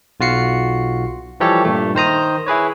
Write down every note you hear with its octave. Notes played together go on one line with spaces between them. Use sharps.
B1 F4 F#4 C7 C#7
E3 F3 G3 G4 A4 C#5
G2 A#2 A3
D#3 C5 A#5 D#6
E4 G#4 B4 C#5